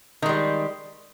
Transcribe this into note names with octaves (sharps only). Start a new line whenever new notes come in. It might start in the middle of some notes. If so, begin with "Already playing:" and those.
D#3 G3 G#3